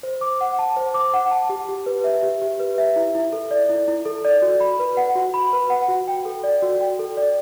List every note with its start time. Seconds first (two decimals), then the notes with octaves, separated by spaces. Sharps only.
0.03 C5
0.21 D6
0.41 F#5
0.59 A5
0.77 C5
0.94 D6
1.14 F#5
1.31 A5
1.49 G4
1.69 G4
1.86 B4
2.04 E5
2.23 G4
2.42 G4
2.59 B4
2.78 E5
2.96 E4
3.15 E4
3.33 A4
3.51 D5
3.69 E4
3.88 E4
4.05 A4
4.25 D5
4.42 F#4
4.60 B5
4.79 B4
4.97 F#5
5.15 F#4
5.34 B5
5.53 B4
5.70 F#5
5.88 F#4
6.08 G5
6.25 A4
6.43 D5
6.62 F#4
6.81 G5
6.99 A4
7.17 D5